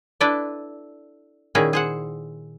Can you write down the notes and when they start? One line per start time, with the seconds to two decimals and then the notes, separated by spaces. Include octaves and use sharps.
0.20 D4 E4 A4 B4 D5
1.55 A#2 D#3 C#4 E4 G#4
1.73 G#4 C5 F#5